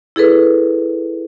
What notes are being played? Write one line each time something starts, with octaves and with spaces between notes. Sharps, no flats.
E4 G#4 A4 B4